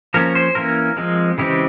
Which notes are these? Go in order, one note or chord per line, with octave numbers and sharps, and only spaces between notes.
F3 A#3 C#4 A#4
C5
E3 A#3 C#4 A#4
F3 G#3 C4
C#3 E3 G#3 C4 G4